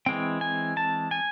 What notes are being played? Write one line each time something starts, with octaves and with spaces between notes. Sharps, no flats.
E3 G#3 C4 G5
G#5
A5
G#5